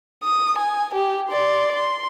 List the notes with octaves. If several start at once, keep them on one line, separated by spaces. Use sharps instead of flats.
D#6
G#5
G4
D5 C6
C6